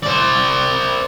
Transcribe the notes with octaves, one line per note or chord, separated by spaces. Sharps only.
C5 D5